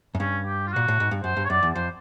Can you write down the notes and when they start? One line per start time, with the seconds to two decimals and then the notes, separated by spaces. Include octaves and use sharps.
0.15 F#2
0.20 G2 C#4
0.46 G4
0.67 F4
0.72 A#2 F#4
0.88 A2
1.00 G#2
1.11 G2
1.23 F#2 C5
1.37 G2
1.45 C#5
1.49 F#2 D5
1.63 E2
1.75 F2 C5